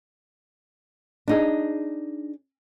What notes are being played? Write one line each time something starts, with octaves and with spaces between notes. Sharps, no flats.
D4 D#4 G#4